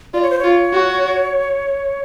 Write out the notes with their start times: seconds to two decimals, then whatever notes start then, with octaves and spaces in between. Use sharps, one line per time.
0.14 F4 D5
0.23 C#5
0.30 C5
0.39 F4 C#5
0.73 F#4